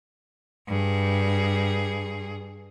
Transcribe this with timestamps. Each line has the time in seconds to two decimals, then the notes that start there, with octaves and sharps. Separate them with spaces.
0.68 G2 G#4